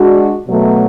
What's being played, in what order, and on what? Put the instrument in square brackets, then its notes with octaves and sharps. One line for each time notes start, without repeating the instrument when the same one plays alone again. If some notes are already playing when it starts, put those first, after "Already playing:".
Already playing: [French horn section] G#3 D4 F#4
B2 F#3 A3